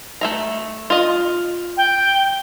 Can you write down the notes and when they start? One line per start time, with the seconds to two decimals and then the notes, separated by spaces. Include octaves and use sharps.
0.21 A3 E5 A#5
0.90 F4 D#5
1.77 G5